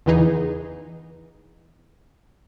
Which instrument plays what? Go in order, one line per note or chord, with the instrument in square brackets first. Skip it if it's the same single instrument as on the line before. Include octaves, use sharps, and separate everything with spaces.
[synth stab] E2 C#3 E3 B3 D#4 G#4